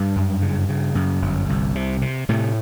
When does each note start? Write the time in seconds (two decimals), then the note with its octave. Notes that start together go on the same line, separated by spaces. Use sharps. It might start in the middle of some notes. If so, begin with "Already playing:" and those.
Already playing: G2 G3
0.16 F#2
0.42 C#3
0.69 C#3
0.95 F#2
1.22 G1
1.50 C2
1.75 C3
2.02 C3
2.29 A2 C3 A3